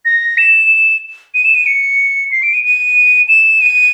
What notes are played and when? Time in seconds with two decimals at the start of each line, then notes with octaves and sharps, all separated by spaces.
0.05 A#6
0.38 E7
1.34 D#7
1.45 E7
1.55 D#7
1.66 C#7
2.32 C7
2.43 D7
2.53 D#7
2.64 D#7
3.28 E7
3.61 D#7